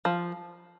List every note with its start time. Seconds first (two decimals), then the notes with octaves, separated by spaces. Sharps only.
0.05 F3